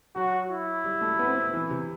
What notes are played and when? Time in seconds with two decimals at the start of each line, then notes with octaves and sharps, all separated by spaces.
0.15 F#3 F#4
0.50 E4
0.84 G3
1.01 A3
1.19 B3
1.28 C4
1.35 B3
1.54 E3
1.70 C3